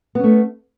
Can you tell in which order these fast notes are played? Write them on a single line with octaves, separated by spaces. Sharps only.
B3 C#4 A3